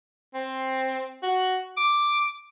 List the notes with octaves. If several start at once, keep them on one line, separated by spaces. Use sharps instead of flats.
C4
F#4
D6